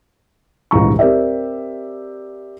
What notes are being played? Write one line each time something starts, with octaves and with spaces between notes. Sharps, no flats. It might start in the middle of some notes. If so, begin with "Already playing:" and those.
D#1 C#2 G#2 E3 A#5 C#6
C4 G4 A#4 D5 E5